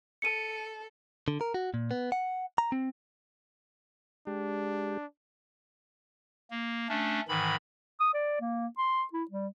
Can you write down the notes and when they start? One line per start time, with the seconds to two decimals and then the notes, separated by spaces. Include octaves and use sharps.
0.22 A4 C#7 D#7
1.28 D3
1.41 A#4
1.54 F#4
1.74 A#2
1.91 B3
2.12 F#5
2.58 A#5
2.72 C4
4.27 G#3 D4 G4
6.51 A#3
6.89 A3 C#4 D4
7.28 G#2 D#3 E3 B5
8.00 D#6
8.14 D5
8.40 A#3
8.78 C6
9.13 E4
9.31 G3